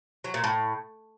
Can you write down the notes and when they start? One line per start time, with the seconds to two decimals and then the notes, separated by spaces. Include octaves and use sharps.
0.24 F#3
0.34 A#2
0.44 A2